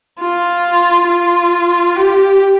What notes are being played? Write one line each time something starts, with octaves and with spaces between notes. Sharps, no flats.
F4
F4
G4